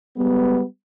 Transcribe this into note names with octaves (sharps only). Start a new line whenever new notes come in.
G3 G#3 B3